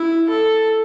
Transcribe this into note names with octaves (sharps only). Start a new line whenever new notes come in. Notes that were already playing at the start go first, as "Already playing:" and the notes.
Already playing: E4
A4